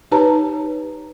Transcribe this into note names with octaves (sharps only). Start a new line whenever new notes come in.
D#4 G4 B4 C#5 A5 A#5